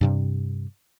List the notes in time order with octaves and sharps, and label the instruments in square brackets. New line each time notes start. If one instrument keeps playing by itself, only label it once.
[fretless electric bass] G2 C3 G3